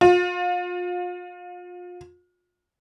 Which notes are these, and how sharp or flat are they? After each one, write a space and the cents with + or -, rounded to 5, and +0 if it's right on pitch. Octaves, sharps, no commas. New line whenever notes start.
F4 +35